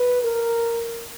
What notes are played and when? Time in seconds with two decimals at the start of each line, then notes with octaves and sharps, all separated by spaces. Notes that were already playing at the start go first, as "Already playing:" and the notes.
Already playing: B4
0.22 A#4